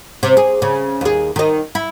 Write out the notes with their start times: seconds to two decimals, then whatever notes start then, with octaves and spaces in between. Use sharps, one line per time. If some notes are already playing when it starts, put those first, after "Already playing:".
0.23 C3
0.37 G#4
0.62 C#3
1.01 D#2 G#4
1.36 D#3 D#5
1.75 E4